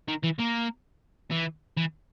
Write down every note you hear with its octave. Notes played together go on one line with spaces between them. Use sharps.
D#3
E3
A#3
E3
E3